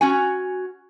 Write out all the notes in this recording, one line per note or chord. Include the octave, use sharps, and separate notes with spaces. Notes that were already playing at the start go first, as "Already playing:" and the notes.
C#4 F#4 G#5